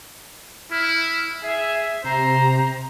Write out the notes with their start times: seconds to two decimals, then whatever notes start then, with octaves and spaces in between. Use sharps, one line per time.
0.71 E4 F6
1.43 G#4 E5
2.04 C3 C5 A#5